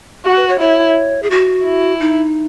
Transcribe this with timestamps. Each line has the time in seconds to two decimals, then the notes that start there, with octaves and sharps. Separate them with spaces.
0.25 F#4
0.36 B4
0.49 C#5
0.60 E4 C#5
1.23 G#4
1.30 F#4
1.65 E4
2.00 D#4